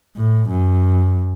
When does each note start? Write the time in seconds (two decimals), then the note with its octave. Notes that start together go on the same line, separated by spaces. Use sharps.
0.17 A2
0.49 F#2